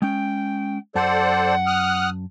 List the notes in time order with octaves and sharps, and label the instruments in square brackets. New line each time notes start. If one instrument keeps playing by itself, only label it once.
[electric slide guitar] G#3 C#4 [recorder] G5
[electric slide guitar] F#2 A5 [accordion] A4 C5 D5 [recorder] F#5
[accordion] D#6 F6 F#6